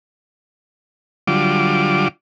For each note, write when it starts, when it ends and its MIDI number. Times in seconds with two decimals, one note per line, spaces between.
1.27 2.08 50
1.27 2.08 54
1.27 2.08 55
1.27 2.08 65
1.27 2.08 86